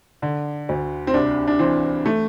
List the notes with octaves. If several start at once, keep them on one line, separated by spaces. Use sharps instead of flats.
D3
D2
C4
C2 D4
D4
E3 C4
A3